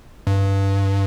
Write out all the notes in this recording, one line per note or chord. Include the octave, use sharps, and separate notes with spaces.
G2